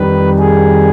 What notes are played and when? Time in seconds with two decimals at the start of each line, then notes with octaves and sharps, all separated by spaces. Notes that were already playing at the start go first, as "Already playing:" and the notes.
Already playing: F2 D#3 G3 B4
0.38 G#4